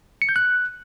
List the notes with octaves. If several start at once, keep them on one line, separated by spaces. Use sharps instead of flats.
C#7
G6
F#6